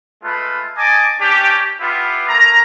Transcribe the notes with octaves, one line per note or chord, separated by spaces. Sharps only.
G#3 A3 F4 B4
D#5 G#5 A5 D6
C#4 D4 G4
B3 E4 F4 G4 B4
A3 A#3 A#5